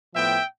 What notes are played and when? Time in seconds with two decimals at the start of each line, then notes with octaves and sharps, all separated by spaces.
0.14 A2 F3 B3 E5 G5